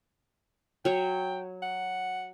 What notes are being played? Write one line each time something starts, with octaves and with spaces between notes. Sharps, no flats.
F#3 C#5 G5
F#5